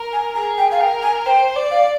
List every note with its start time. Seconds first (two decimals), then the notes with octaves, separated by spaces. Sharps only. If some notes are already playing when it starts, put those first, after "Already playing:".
Already playing: A#4
0.13 G#5
0.35 G#4 A#5
0.58 G5
0.71 F5
0.80 A#4 G5
1.03 G#5
1.26 C5 G5
1.56 D5
1.71 F5